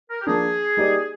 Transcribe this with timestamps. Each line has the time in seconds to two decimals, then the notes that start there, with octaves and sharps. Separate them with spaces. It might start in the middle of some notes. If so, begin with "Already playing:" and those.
0.10 A#4
0.21 G4
0.26 F3 A#3 D4 G#4
0.77 G3 A#3 D#4 G4 D5